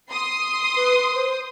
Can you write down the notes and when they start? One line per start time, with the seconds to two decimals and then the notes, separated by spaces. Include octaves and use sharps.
0.10 C6 D#6
0.76 B4
1.15 C5